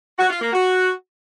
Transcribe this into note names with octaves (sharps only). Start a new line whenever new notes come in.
F#4
F4
A#3
F#4